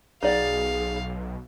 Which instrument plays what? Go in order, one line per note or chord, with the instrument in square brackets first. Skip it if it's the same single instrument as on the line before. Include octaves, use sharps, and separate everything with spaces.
[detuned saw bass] B1 [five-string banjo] D#4 D5 F#5 [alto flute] G#4 [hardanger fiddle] F5